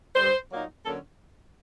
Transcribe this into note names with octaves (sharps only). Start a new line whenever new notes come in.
G2 D3 G3 C5
A#2 F#3 A#3 D#4
D3 F#3 A#3 C#4 A4